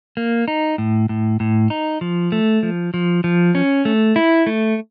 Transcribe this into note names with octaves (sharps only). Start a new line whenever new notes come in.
A#3
D#4
A2
A2
A2
D#4
F3
A3
F3
F3
F3
C#4
A3
E4
A3